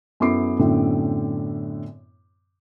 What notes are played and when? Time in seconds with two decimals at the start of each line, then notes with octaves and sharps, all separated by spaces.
0.20 F#2 B3 E4 A4 D6 C7
0.59 F#2 A2 D3 B3 C4 E4